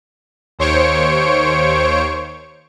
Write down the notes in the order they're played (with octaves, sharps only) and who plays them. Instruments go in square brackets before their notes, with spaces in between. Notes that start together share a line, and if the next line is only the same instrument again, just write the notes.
[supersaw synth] D#2 C5 C#5 C#6 D7